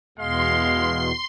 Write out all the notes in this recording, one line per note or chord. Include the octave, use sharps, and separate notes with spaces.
E2 B2 G#3 F5 C6